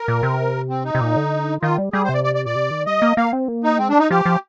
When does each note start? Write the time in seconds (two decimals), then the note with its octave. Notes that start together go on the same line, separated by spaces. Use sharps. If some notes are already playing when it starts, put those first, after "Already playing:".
Already playing: A#4
0.08 A#2
0.23 C3
0.69 C4
0.85 D#4
0.95 C3
1.01 A#2
1.16 D3
1.62 D#3 F4
1.78 G3
1.93 G3 G#4
2.04 C5
2.09 C3
2.14 D5
2.24 D5
2.35 D5
2.46 A#2 D5
2.55 C3
2.71 D#3
2.86 G3 D#5
3.02 A#3
3.17 A#3 F5
3.33 C4
3.48 A#3
3.64 D#4
3.78 G#3 C4
3.89 D4
3.99 D#4
4.11 F3 G4
4.25 F3